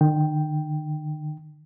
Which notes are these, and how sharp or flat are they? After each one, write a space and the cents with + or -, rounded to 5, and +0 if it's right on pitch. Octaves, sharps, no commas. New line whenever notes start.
D#3 -45 G5 +0